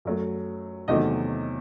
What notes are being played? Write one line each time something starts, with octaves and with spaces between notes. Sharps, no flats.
F#2 F#3 A3
E2 C3 D#3 F#3 A3 D#5